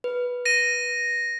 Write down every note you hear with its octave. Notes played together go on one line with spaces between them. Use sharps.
B4
A#6 D#7